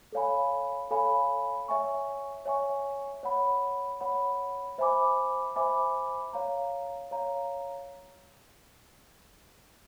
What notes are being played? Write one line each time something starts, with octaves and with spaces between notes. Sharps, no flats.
A4 C#5 F5 G#5 B5
A4 C#5 F5 G#5 B5
C#5 E5 G#5 C#6
C#5 E5 G#5 C#6
C#5 F#5 B5
C#5 F#5 B5
C5 E5 G#5 B5 D6
C5 E5 G#5 B5 D6
C#5 F5 A#5
C#5 F5 A#5